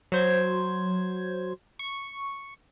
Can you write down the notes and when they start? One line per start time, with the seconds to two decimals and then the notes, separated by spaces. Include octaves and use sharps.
0.12 F#3 C5 G#6
1.79 C#6